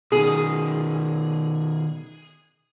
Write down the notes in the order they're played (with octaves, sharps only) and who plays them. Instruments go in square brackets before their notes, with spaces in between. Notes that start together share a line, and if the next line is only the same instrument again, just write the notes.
[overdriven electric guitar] B2 D#3 [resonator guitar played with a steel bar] G#4